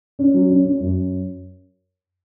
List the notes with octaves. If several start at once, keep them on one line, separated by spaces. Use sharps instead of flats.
C#4
F#3
C#4
C#4
F#2